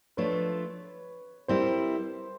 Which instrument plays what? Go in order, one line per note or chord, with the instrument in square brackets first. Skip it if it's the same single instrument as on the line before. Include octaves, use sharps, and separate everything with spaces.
[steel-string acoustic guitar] F3 A3 D4 F4 [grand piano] B4 C#5
[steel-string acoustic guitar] G3 C4 E4 [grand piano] A#4 C5